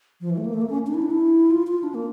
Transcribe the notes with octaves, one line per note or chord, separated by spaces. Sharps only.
F3
E3
A3
A#3
A3
A#3
C#4
D4
E4
D4
E4
F4
F4
D4
A#3